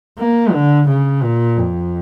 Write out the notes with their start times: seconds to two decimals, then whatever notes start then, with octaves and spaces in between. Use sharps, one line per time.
0.18 A#3
0.53 D3
0.88 C#3
1.23 A#2
1.57 F2